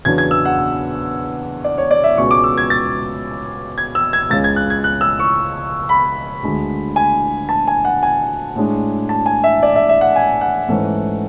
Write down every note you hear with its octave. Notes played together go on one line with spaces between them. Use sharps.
E2 C#3 F#3 B3 D4 G#6
G#6
E6
F#5
D5
C#5
D5
E5
C#2 B2 G#3 C#4 C#6
D6
E6
G#6
A6
G#6
E6
G#6
C#2 C#3 G#3 C#4 A6
G#6
F#6
G#6
F#6
E6
C#6
B5
D2 D3 G#3
G#5
A5
G#5
F#5
G#5
A2 G#3 D4
A5
G#5
E5
D5
E5
E5
F#5
G#5
F#5
G#2 E3 A3 C#4